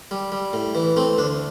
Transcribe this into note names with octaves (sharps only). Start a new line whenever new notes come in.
G3
G3
A2
E3
A3 C4
D2 D4